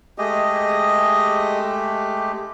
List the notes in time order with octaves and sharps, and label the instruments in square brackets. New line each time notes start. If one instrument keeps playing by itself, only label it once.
[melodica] G#3 A3 G4 [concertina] G#4 D#5